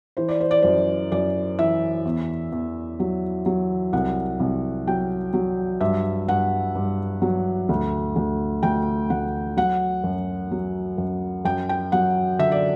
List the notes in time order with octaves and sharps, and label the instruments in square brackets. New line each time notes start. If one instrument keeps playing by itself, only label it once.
[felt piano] E3 C5
D5
C5
D5
F#2 C5
F#2 D5
E3 E5
E2
E2
F#3
F#3
C2 F#5
C2
F#3 G5
F#3
G2 E5
G2 F#5
G2
F#3
D2
D2
D2 G5
D2 F#5
F#3 F#5
F#2
F#3
F#2
F#2 G5
G5
F#3 F#5
D3 E5
D5